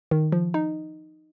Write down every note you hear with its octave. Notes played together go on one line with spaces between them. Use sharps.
D#3
F3
D#4